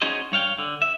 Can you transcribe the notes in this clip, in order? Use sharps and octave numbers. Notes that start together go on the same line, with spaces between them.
C#4 D#4 F#4 G#4 C5 D#5
G2 C#5 F5 G5
D3
E5